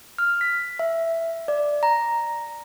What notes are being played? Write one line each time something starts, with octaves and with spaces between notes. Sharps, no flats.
F6
B6
E5
D5
A#5